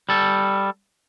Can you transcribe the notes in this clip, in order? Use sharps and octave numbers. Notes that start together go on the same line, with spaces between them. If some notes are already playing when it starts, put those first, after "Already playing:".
G3 A4